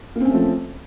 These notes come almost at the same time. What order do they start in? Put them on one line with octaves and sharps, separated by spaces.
A#3 C4 C#4 A3 F3